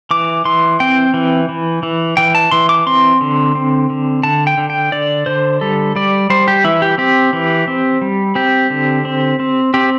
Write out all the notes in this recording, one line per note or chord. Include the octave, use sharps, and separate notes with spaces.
E3 D6
E3 C6
C4 G5
E3
E3
E3
E3 G5
A5
E3 C6
D6
C4 C6
D3
C4
D3
D3 A5
G5
D3
G5
D3 D5
D3 C5
G3 A4
G3 D5
G3 C5
G4
E3 E4
G4
C4 G4
E3
C4
G3
C4 G4
D3
C4
C4
C4 G4